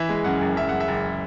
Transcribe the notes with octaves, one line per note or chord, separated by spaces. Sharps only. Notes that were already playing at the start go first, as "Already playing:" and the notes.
Already playing: E3 E5
G#3
F#2 F#5
F#1
F#2 E5
F#2 F#5
E5
F#1